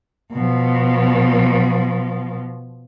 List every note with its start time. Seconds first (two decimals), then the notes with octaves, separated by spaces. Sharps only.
0.33 B2 F3